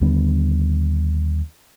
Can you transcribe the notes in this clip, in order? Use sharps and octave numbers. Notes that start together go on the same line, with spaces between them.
D#2 D3 G3 B3